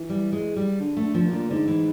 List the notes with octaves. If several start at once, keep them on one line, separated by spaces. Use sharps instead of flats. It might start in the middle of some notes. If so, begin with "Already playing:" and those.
Already playing: E3
G3
G#3
G3
D3
A3
D3
F3
A#2
D3
G#2 D3
E3